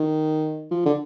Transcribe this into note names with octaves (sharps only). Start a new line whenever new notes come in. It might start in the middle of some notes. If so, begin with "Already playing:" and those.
Already playing: D#3
F3
D3